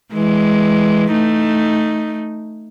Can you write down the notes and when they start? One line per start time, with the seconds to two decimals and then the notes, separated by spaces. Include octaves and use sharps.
0.14 E3 G#3
1.11 A3 D#4